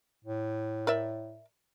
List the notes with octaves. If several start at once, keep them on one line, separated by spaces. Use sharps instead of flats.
A2
A#4 D5 E5